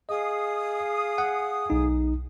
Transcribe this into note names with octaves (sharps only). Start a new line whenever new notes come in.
G#4 D#5 F5 D#6
F#5
B1 D#4